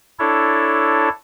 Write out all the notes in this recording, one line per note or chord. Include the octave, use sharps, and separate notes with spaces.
D4 E4 A4 C#5